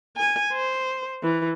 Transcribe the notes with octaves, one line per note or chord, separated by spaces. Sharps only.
G#5
C5
E3